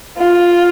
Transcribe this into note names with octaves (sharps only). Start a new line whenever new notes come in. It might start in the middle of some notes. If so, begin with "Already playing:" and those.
F4